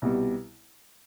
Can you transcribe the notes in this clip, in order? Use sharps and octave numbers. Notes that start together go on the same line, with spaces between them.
C2 B2 G3